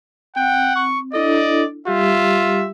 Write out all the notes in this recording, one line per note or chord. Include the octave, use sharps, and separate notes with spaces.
C4 F#5 G5
C#6
D4 E4 A4 D5 D#5
G3 F4 G4 E5